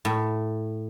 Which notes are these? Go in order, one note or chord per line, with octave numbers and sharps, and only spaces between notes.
A2